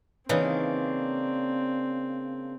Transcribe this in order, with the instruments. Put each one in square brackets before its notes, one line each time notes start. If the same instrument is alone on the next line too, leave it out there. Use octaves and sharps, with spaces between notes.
[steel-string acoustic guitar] C#3 A#3 D4 [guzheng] E3 D#4 [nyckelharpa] C4